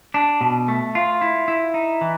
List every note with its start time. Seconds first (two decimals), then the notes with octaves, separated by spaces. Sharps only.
0.14 D4
0.41 B2
0.68 A3
0.95 F4
1.21 E4
1.48 E4
1.74 D#4
2.01 E3